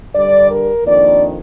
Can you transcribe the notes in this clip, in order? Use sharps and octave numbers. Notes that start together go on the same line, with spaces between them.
G2 D3 G3 D5
A#4
F2 D#3 A#3 D4 D5